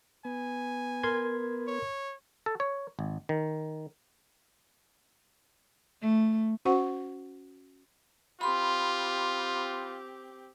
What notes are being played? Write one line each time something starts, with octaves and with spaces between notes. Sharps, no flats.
B3 G#5
A#4 C6 G#6
C#5
A4
C#5
G#1
D#3
A3
C#4 F#4 C5 F#5 C#6
C4 F4 G4 B5 C6